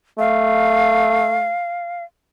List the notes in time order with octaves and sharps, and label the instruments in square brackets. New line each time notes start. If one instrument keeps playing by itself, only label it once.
[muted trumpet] A3 [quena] F5